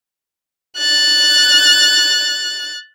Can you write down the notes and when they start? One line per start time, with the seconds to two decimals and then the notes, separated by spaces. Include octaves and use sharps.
0.79 F#6 A6